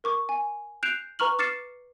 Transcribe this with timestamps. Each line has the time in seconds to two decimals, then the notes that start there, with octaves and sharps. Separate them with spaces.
0.04 A#4 C#6 D6
0.29 G#5
0.83 F#6 G6 C7 D7 E7 F7
1.19 B4 A#5 C#6 F6 F#7
1.39 D6 F6 A6 C7 C#7 E7